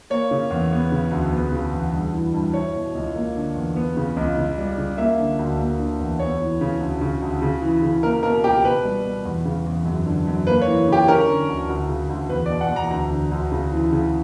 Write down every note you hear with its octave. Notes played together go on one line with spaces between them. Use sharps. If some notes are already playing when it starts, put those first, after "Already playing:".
A#3 C#5
C#3
E2
B3
C#3
D2
B3
C#3
E2
G2
E3
G2
E4 C#5
B2
C#2
A#3
D3
E2
B3
C#3
C#2
C#3
G3
C#3
A#3 E5
D3
D2
A#3
D3
E2
B3 C#5
E3
C#3
D2
C#3
D2
C#3
E3
C#3
A#3 A#4
B2 A#4
C#2 G4
B2 B4
G3
B2
E2
C#3
E2
F#2
D3
F#2
A#3 B4
C#5
E3
C#3 G4
C#4 A#4
D3
D2
D2
C#3
D2
E2 B4
D5
B2
F#5
E2
A#5
D2 A#5
D3
D2
C#3
E3
C#3